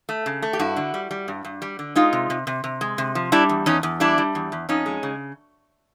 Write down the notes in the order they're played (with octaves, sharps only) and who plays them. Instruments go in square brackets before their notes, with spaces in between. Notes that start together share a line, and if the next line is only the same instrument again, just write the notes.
[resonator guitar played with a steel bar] A3
C#3
A3
G4
G2 E4 F#4
D3
G3
G3
G2
G2
G3
D3
G#3 D#4 F4
C3
C3
C3
C3
G#3
C3
F3
G3 D4 E4
E2
E2 C#4 D#4
E2
G3 D4 E4
G3
E2
E2
F2 C#4 D#4
G#3
C#3